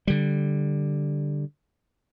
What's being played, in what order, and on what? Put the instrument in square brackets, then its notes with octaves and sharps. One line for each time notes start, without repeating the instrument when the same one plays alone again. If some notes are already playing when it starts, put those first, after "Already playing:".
[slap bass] D3 G3